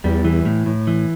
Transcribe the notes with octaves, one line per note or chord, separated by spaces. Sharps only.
E2 G3
E3
A2
A2
E3